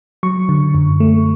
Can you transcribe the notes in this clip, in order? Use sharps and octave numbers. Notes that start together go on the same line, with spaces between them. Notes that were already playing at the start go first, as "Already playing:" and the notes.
F#3 C#6
D3
F#2
A3